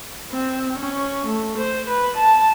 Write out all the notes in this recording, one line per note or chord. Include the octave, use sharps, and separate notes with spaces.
C4
C#4
A3
C5
B4
A5